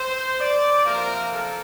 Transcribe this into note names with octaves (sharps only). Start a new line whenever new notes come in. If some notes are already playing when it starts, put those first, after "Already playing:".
Already playing: C5
D5
C3 F3 A#3 A#4
A4